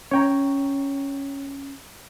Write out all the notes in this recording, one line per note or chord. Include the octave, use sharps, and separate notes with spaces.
C#4 C#5 G5 A#5